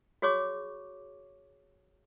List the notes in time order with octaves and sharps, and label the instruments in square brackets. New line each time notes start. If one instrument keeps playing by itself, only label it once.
[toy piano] F#4 G#4 C#5 C#6 D6